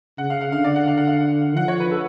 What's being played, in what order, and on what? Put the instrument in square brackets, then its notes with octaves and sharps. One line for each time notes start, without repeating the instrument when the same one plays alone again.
[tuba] C#3 [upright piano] F#5
[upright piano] F5
F5
[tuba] D3 [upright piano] F5
[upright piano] D5
F#5
F5
F#5
F5
[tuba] F3 [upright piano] F#5
[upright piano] C#5
B4
A4